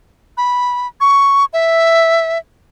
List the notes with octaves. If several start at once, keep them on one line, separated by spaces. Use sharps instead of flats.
B5
C#6
E5